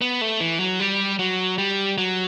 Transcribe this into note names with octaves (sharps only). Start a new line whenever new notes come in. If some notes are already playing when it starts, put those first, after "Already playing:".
B3
A3
E3
F#3
G3
F#3
G3
F#3